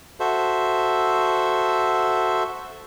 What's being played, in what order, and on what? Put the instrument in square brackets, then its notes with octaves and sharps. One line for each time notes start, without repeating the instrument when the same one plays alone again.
[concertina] F#4 A4 C5 E5